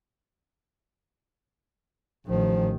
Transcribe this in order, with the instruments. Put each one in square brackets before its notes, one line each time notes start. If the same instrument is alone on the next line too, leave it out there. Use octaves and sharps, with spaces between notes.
[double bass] A1 D#3 [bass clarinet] F3